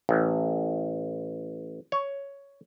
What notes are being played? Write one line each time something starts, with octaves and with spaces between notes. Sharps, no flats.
A1
C#5